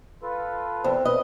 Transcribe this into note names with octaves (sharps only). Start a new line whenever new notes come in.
F4 A4 B4
E2 C4
B4 D#5